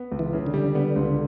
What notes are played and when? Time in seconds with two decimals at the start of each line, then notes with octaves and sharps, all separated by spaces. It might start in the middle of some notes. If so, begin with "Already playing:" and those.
Already playing: B3
0.12 C#2
0.19 E3
0.33 C#3
0.47 D3
0.54 G3
0.75 B3
0.96 C#2